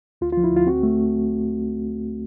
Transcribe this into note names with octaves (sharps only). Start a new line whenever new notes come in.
D2 F4
F3 F4
E4
D2 F4
C4 F#4
A3